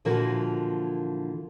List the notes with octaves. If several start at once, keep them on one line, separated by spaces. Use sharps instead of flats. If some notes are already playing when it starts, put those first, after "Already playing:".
A#2 D3 E3 F3 F#4 A#4